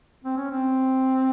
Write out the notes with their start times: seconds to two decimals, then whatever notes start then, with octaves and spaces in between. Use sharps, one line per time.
0.24 C4
0.37 C#4
0.51 C4